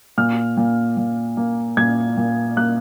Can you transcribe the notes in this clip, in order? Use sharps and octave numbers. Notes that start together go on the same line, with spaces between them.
A#2 F6
A#2
A#2
A#3
A#2 G#6
A#2
A#3 F#6